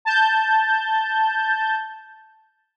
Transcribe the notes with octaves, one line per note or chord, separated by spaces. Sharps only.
A5 G6